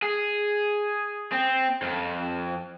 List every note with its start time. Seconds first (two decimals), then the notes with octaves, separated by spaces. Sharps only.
0.03 G#4
1.32 C4
1.82 F2